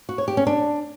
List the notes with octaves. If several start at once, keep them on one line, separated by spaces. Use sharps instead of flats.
F#4
C#5
G4
C#4
D4